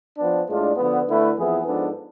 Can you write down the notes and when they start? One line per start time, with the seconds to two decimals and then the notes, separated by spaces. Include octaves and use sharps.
0.17 F3 B3 D4
0.47 A2 G#3 D4 F4
0.77 D3 F3 B3
1.07 D3 A3 E4 B4
1.36 F2 E3 B3 E4 G#4
1.66 G#2 F3 B3 D4 A4